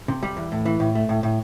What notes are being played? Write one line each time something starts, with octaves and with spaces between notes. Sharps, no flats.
C3
G3
E2
A2
E3
A2
A3
A2
A2